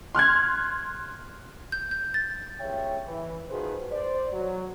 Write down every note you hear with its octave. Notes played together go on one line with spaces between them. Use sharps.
C6 F6 F#6 G#6
G6
G6
A6
C#2 G3 C#5 E5 G5
E3
D#3 F3 F#4 G#4 B4 C5
C5 D5
F#3